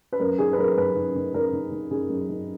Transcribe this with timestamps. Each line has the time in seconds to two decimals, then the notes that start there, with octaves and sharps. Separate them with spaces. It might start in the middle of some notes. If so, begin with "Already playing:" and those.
0.13 B4
0.20 F#2 A#4
0.38 D#3 G#4
0.53 B4
0.58 F#2 A#4
0.77 F#2 B4
0.96 D#3
1.15 D#3
1.33 D#3 A#4
1.53 D#3
1.72 D#3
1.91 D#3 G#4
2.09 F#2
2.29 D#3